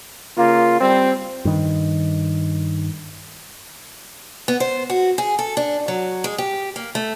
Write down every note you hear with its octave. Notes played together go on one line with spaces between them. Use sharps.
C#3 A#3 F4
G3 C4
G2 D#3
B3
C5
F#4
G#4
A4
D4
F#3
G#3
G4
A#3
A3